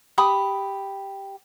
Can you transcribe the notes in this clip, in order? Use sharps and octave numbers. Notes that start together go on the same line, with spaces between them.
G4 B5 D#6